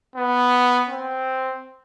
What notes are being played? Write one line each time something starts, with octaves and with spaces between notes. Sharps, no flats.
B3
C4